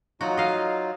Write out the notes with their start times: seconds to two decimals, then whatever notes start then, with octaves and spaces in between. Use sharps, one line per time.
0.21 F#3 D#4 F4 F#4
0.37 D#5 F5